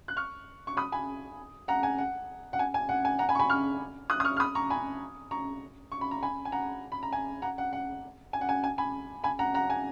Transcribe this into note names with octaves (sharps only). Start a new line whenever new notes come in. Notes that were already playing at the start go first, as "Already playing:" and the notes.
F#6
C#6 F6
C#6
B5 D#6
G#5 B5
F#5 A#5
G#5
F#5
F#5
G#5
G#5
F#5
G#5
F#5 A#5
G#5 B5
C#6
G#5 B5
C#6 F6
D#6 F#6
D#6
C#6 F6
F6
B5 D#6
A#5 C#6
G#5 B5
A#5 C#6
C#6
B5
A#5
G#5 B5
G#5
F#5 A#5
B5
A#5
G#5
F#5 A#5
F#5
F#5
G#5
F#5
G#5
G#5
G#5 B5
G#5 B5
F#5 A#5
F#5 A#5
G#5